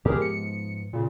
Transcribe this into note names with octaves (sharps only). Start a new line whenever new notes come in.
G#2 F3 B3 G4 G#4 A#4
C#7
A#2 C#3